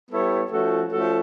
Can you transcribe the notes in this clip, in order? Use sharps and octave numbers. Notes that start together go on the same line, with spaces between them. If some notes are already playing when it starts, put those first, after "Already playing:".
G3 B3 E4 A4 C#5
F3 A3 C#4 F#4 A4
F3 A3 C#4 F#4 A4